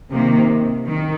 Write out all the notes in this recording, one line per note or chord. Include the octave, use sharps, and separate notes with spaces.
C3 D#3 A#3
D#3